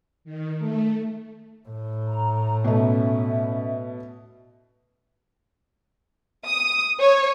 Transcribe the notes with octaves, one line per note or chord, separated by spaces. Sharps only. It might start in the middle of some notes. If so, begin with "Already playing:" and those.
D#3
A3
A2
A#5
B2 A3 C#4 E5
D#6
C#5